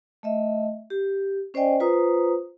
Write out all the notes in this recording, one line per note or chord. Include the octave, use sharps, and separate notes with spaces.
A3 D#5 E5
G4
C#4 C5 D5 D#5 G5 G#5
F4 B4 C5 A#5 D#6